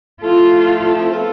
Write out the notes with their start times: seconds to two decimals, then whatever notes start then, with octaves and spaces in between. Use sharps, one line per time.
0.22 F3 A3 C4 E4 F4 A4
1.12 B3 F4 A4